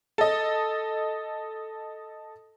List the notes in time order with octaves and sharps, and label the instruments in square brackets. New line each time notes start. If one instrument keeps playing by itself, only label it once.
[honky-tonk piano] A4 D#5